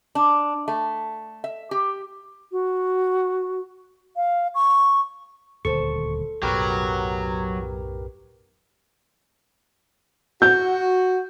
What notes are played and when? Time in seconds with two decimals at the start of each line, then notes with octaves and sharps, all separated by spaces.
0.15 D4
0.68 A3
1.44 E5
1.71 G4
2.52 F#4
4.16 F5
4.55 C#6
5.65 D#1 D2 A4 C5 C#6
6.43 B1 F#2 A2 F#3 G4 A#4 B4
10.42 F#4 G6